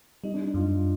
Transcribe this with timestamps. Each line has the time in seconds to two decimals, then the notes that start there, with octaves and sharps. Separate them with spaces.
0.24 G3 D#4
0.34 D4
0.44 D#4
0.54 F#2 F4